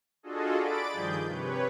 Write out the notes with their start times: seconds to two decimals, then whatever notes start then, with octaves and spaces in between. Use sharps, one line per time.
0.23 D4 F4 F#4 G#4 A4 D#5
0.58 D5 B5 A6 D7
0.91 G2 D#3 F3 G#4 G6
1.28 C3 B4 C#5